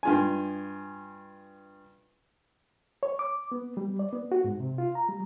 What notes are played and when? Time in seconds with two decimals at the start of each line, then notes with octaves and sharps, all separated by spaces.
0.03 G2 F4 G#5
3.03 C#5
3.19 D6
3.52 B3
3.77 G3
3.99 D5
4.13 B3
4.32 F#4
4.44 G#2
4.60 C3
4.78 F4
4.95 A#5
5.09 G3